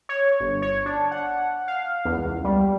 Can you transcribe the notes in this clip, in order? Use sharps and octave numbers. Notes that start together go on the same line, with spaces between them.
C#5
G1
C#5
D4
F#5
F5
E2
C#2
G3